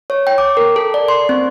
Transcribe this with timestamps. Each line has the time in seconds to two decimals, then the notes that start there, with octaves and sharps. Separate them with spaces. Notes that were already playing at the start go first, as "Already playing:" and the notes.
0.10 C#5
0.27 G5
0.38 D6
0.57 A#4
0.76 A4
0.94 D5
1.08 C6
1.29 C4